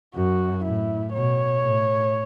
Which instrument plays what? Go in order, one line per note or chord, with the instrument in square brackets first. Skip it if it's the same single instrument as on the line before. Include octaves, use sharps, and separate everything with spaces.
[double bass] F#2 [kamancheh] F#4
[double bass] A2 [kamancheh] E4
[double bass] B2 [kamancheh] C#5
[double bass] A2